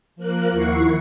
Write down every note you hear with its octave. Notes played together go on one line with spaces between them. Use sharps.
F3 A#3 A#4 F#6
D#2 E4 F#5 C#6 C7